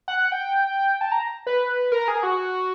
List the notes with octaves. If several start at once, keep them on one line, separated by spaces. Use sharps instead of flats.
F#5
G5
A5
A#5
B4
A#4
G#4
F#4